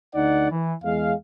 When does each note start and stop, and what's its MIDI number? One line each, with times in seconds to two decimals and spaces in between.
0.14 0.47 38
0.14 0.47 63
0.14 0.47 74
0.14 0.47 78
0.51 0.74 52
0.83 1.13 40
0.83 1.13 56
0.83 1.13 77